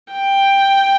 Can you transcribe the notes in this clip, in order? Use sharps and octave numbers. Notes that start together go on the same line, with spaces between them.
G5